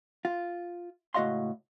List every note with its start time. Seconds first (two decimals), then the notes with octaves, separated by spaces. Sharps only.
0.25 F4
1.14 C#2 A2 F#4 D#5 F5 C6